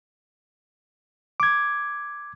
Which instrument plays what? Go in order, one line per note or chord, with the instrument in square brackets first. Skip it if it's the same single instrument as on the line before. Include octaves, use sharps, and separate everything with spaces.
[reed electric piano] D6 G#6